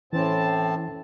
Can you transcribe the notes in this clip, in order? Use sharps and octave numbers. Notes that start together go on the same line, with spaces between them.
A2 E3 C4 C#4 A5